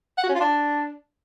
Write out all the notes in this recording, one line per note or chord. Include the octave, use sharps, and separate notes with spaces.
F#5
F#4
C#4
F4
D4